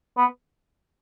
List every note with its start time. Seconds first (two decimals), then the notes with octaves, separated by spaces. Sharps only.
0.18 B3